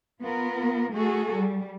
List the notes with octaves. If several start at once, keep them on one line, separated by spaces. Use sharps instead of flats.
B3 F4 A#4
A3 F#4 G#4 A4
G3